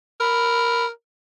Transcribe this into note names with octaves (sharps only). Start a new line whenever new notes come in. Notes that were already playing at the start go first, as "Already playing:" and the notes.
A#4 B5